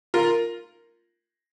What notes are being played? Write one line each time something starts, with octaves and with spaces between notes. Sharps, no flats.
F4 A#4